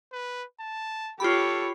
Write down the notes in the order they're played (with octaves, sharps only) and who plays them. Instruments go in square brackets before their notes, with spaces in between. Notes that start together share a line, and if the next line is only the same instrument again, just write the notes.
[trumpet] B4
A5
[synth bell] F4 B5 [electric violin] G4 C#5 [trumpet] A4